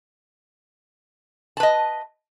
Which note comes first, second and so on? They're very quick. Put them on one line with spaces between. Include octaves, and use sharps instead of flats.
A5 B4 D#5